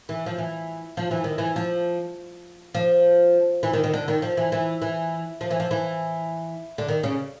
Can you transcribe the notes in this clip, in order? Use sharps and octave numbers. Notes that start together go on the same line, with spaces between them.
E3
F3
E3
F3
E3
D#3
E3
F3
F3
E3
D#3
D#3
D3
D#3
F3
E3
E3
E3
F3
E3
F3
E3
D3
D#3
C#3